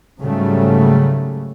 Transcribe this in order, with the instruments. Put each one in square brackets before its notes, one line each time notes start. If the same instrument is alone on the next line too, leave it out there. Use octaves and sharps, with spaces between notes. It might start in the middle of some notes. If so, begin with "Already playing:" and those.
[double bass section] G#2 C#3 F#3 G3 A3